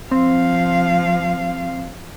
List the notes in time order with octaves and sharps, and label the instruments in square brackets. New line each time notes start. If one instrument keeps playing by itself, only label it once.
[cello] F3 F5 [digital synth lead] C4